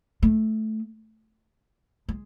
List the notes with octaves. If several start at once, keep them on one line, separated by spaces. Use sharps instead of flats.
A3
G#3